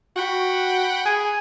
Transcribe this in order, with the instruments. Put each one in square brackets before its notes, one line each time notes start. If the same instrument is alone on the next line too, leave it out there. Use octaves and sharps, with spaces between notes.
[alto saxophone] F#4 [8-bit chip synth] F#5 G5 B5
[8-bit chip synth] G#4 [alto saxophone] G#5